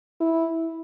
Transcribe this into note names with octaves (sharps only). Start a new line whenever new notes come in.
E4